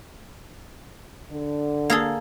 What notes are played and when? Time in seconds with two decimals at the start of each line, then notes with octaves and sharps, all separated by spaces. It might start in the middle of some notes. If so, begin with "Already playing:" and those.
1.31 D3
1.90 A#3 G#4 A4